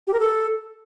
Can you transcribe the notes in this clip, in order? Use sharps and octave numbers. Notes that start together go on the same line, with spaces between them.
G4
A#4
A4